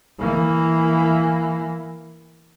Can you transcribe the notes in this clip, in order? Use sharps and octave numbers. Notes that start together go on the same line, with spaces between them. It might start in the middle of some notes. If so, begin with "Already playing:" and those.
E3 A#3